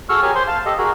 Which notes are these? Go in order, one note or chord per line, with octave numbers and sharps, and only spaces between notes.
F#4 G#4 A4 C#6 E6 F6
G4 G#4 A#4 C#5 G#5
C5 C6
F5 A5
G4 A4 D#5
F#4 G#4 A#4